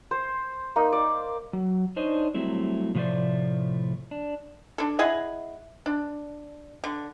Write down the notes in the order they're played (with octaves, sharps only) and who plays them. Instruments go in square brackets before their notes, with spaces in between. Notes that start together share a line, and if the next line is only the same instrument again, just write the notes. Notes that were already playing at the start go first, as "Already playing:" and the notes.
[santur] C5
A#3 D#4
D5
[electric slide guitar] F#3
D4 D#4 C5 C#5 D#5
F#3 G3 A3 C4 E4
A2 C3 F3 A3 C5 D5
D4
[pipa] D4 A4
E4 G#4 D#5 F#5
D4
D3